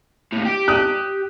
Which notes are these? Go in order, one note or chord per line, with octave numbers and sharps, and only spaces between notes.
D#2 A2
G4
D#6 F#6